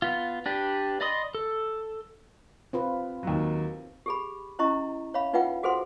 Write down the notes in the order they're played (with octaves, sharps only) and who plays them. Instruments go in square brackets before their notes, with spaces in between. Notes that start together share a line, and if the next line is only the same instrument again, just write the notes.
[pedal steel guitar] B3 F4
D4 G4 B4
D5 D#5 B5 C6 D#6
A4
[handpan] C4 F4 B4
[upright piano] D#2 F#3
[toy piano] G4 G#4 B5
C#4 E4 D#5 A#5 C#6
C#5 E5 F5 B5
D#4 F4 B4 E5 F#5 G5
F#4 G#4 A4 C5 F#5 C6